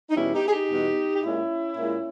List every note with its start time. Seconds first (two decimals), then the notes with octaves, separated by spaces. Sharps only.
0.10 D#4
0.16 E2 B2 G3 C#4 E4
0.34 D#4 G4
0.48 G#4
0.52 D#4 G4
0.70 E2 B2 G3
1.15 G4
1.23 A#2 G#3 C#4 E4
1.78 A#2 G#3